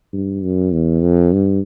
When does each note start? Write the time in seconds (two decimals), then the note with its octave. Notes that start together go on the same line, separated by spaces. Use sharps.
0.13 G2
0.43 F#2
0.73 E2
1.03 F2
1.33 G2